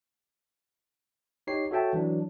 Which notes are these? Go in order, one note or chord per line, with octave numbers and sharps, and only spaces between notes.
D#4 G4 C#5 C7
F#4 A4 C#5 E5 G5 A5
E3 F#3 D4